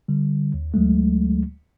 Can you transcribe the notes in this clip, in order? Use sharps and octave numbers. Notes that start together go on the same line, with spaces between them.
D3 G3
D#2
D2 F#3 G#3 A3